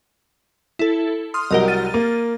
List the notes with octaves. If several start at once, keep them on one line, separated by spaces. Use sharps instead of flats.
E4 A4
C6 D#6 F6
C2 F#3 G4 A#4 D#5
F6 A6 D#7
A#3